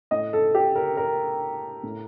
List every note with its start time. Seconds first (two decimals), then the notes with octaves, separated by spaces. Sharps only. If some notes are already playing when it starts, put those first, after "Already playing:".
0.11 A2 D#5
0.33 A4
0.55 G4
0.76 A#4
0.97 A#4
1.83 A2